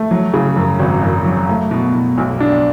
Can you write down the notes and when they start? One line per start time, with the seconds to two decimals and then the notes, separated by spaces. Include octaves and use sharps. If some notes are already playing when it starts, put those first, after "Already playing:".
Already playing: A3
0.11 F#3
0.34 C#3
0.56 F#2
0.80 G#1
1.03 F#2
1.26 F#3
1.49 A3
1.71 B2
1.95 B2
2.17 B1
2.40 D4